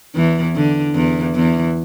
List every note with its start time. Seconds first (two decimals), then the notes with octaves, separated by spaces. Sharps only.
0.15 E2 E3
0.55 D3
0.95 E2 E3
1.35 E2 E3